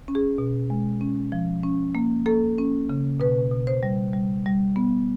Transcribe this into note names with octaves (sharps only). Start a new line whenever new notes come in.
C#4
G#4
B2
G#3
C#4
F3
C#4
A#3
A#3 A4
C#4
C#3
B2 B4
B2
C5
G3
G3
G3
B3